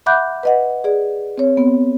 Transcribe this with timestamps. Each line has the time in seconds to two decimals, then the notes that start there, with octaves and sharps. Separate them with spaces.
0.06 E5 F#5 B5 D6 F#6 G6
0.43 B4 D#5 F#5
0.84 G#4 D5
1.38 C4 C#5
1.57 B3 C4